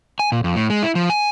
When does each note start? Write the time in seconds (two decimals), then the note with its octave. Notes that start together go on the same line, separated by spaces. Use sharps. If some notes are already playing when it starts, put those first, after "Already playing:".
0.19 G#5
0.32 A#2
0.44 F2
0.56 A2
0.70 G#3
0.83 E4
0.95 F3
1.10 G#5